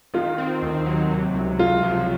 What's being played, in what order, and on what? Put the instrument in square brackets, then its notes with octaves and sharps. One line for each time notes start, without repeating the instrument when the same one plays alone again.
[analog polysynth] D#3 [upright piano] F4
[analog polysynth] C4
D#2
F#3
C3
C#2
[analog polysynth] C#2 [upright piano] F4
[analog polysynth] F3